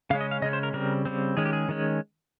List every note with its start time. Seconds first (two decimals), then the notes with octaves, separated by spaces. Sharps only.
0.10 C#3 G#3 C#4 F5
0.21 D#5
0.31 F5
0.42 C#3 G#3 C#4 D#5
0.53 C5
0.63 A#4
0.74 C#3 G3 C4 A#4
1.05 C#3 G3 C4
1.37 D#3 G#3 C#4 G#4
1.46 G4
1.53 G#4
1.69 D#3 G#3 C#4